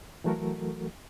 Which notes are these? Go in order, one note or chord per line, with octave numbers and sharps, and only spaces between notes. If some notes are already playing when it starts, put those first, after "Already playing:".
E3 F#3 A3 F#4 A4 A#4